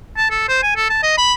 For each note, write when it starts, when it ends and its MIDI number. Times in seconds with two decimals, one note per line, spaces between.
0.17 0.27 81
0.31 0.44 69
0.48 0.60 72
0.63 0.74 80
0.76 0.89 69
0.90 1.02 81
1.03 1.14 75
1.18 1.34 83